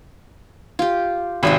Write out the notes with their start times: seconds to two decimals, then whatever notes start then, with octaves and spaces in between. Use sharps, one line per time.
0.79 F4 G4
1.43 G#1 C3 G#5 B5